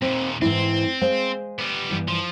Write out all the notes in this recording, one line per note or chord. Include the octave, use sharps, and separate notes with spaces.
D#2 A#2 C4
G#2 E3 C4 E4
G#3 C5 F5
G3 B3
G2 E3
F3